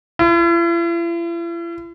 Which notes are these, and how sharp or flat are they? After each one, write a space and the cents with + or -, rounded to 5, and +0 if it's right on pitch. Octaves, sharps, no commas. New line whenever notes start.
E4 +45